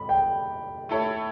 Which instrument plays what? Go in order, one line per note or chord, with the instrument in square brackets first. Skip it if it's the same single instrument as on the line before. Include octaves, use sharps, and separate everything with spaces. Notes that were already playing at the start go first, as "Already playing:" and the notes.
Already playing: [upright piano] G3 [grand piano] B5
[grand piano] G5
[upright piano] A3 E4 A4 C#5